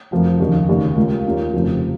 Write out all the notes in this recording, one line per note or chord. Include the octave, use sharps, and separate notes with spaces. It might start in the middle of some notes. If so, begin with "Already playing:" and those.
F1 F2 F3 A#3
D#2 C#3 F3 A#3 D#4
F1 D#2 C#3 A#3
C#2 C#3 A#3 F4
D#2 D#3 A#3 C#4 F4
F1 F2 C#3 F3